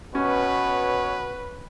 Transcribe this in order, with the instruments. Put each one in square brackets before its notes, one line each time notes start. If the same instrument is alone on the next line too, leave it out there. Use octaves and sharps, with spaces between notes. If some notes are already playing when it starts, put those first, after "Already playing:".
[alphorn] B2 [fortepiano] C#4 [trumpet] B4 [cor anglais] C#5